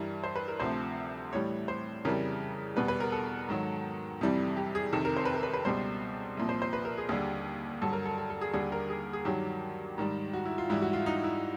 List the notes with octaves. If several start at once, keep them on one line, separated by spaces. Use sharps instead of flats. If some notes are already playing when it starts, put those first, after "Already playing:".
Already playing: G2 E3 G3 A#4
C5
B4
A#4
D2 C3 F3 C5
A2 E3 G3 C#5
C5
F2 C#3 E3 G3 A#4
E2 B2 G3 B4
B4
A#4
A4
G#2 D#3 F#3
F2 C3 E3 G3
G4
G#4
F2 C3 D#3 A4
A#4
C5
B4
A#4
B4
B4
C#2 B2 G3 C5
C2 A#2 F3
C5
C5
B4
A#4
G#4
D#2 D3 G3 G#4
G2 D3 F#3 A4
A#4
A4
A4
A4
G#4
D#2 D3 G3 G#4
A#4
G#4
G#4
G2 D#3 F#3 G4
G#2 D#3 G3
F#4
E4
F4
G#2 E3 G3 E4
F#4
F4
D#4
E4